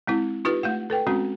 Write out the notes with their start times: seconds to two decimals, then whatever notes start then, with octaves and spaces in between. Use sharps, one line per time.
0.07 G#3 C4 E4
0.45 D#4 F4 G4 B4
0.63 A3 F5 F#5
0.90 A4 B4 G5
1.07 G#3 C4 C#4 F#4